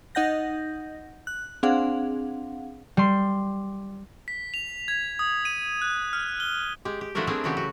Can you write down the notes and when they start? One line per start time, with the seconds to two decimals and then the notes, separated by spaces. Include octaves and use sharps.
0.15 D#4 D#5 F#5 G6 A#6
1.27 F#6
1.63 C4 D4 G#4 F5 F#5
2.97 G3 C6
4.28 B6
4.54 F7
4.88 G#6
5.19 D#6
5.45 D#7
5.82 F#6
6.13 F6
6.40 G7
6.85 G#3 G4
7.01 G4
7.15 F3 A3 D4 E4 F#4 A#4
7.27 G3 A3 C4 D4 G#4 A#4
7.44 C#3 E3 F#3 F#4 G4
7.57 F#4